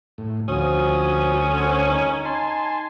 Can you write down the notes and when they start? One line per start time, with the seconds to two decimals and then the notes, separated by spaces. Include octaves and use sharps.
0.18 A2
0.48 D2 F3 C#4 F#4 D#6
1.52 A4 C5 F#5
1.87 D#4
2.25 G#5 A5 C6